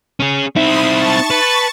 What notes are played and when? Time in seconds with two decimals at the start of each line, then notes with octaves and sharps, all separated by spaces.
0.20 C#4 G#4
0.56 C4 D#4 E4 E5 B5 C6 D#6
0.88 A5 C#6 A6
1.30 B4